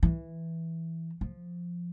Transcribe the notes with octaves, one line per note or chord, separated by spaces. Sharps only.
E3
F3